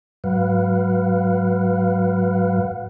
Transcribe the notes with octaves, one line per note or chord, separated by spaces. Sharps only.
G#2 F#3 B4 F5 F#5